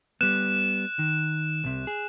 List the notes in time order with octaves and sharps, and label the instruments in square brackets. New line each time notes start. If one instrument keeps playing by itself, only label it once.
[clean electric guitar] G3 B3 [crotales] F#6 E7
[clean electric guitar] D#3
C2 C3
G#4